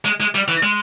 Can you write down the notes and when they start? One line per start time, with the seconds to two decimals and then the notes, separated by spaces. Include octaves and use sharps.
0.05 G#3
0.20 G#3
0.35 G3
0.48 E3
0.63 G#3